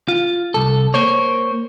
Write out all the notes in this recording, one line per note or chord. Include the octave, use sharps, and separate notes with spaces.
F4
C2 A4
A#3 C5 C#5